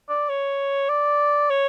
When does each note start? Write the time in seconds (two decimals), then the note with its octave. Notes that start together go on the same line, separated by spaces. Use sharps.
0.09 D5
0.29 C#5
0.89 D5
1.50 C#5